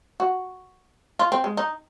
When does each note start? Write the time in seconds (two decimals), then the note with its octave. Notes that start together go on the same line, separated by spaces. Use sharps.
0.20 F#4
1.19 F4
1.32 C4
1.44 G#3
1.57 D#4